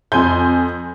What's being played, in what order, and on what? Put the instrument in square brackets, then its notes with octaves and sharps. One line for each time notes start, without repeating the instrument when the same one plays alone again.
[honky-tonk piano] F2 G#5 C6 G6